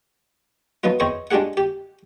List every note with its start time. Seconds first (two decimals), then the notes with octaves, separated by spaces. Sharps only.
0.84 F3 F#3 B3 D#4 F4
1.00 E2 C4 C5 C#5 D#5 C#6
1.31 G#3 D4 F4 G4 G#4 F#5
1.57 G4